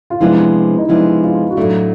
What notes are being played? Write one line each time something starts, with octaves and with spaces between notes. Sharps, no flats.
F4
C3 F3 G#3 B3 D4 E4
D#4
C3 F3 G#3 B3 D4 E4
F4
F#4
A2 F#3 A3 D4 F4